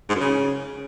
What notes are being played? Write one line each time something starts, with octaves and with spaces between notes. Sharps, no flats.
G#2
F#2
C#3